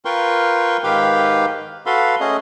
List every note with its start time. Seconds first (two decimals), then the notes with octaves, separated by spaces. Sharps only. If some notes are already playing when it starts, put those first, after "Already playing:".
0.05 F4 A#4 B4 G5 C6 C#6
0.84 G#2 D#3 G4 B4 F5 G5
1.86 F#4 A4 B4 F5 B5 C6
2.20 A3 C#4 G#4 D#5